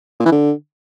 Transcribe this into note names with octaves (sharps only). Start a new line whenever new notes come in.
A#2
E3
D3